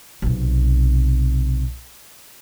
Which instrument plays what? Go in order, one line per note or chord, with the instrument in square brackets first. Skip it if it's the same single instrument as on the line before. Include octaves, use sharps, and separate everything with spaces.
[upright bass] B1 C3